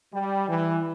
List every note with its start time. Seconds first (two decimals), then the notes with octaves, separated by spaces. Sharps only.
0.13 G3
0.48 E3